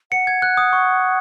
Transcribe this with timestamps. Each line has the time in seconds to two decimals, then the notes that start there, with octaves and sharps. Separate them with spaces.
0.12 F#5 C#7
0.27 G#6
0.42 F#6
0.57 D#6
0.73 C#6